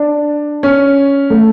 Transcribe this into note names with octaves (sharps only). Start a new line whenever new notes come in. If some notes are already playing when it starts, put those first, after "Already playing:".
Already playing: D4
C#4
A3